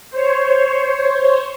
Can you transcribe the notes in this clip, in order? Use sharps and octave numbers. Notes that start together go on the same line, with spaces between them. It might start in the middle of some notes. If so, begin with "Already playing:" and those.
C5 C#5